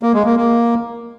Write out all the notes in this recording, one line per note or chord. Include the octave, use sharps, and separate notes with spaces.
A#3
G#3
A#3
A#3